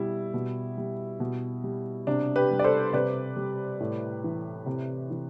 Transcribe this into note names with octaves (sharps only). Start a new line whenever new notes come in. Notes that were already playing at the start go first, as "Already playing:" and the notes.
Already playing: B2 G3 E4
B2
G3
B2
G3
C3 D4
G4 B4
G3
D5
A4 C5
C3 B4 D5
G3
A2
E3
C3
E3